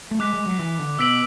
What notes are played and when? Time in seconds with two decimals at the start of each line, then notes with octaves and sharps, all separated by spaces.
0.11 A3
0.20 G#3 D6 F#6 B6
0.33 G#3
0.46 F#3
0.59 E3
0.80 D3
0.99 B2 E6 B6 D7 F#7